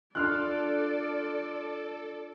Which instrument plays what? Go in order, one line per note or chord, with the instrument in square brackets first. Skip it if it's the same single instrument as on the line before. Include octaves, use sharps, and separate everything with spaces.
[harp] D4 F4 [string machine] A4 [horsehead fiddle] D5 [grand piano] C6 F6 F#6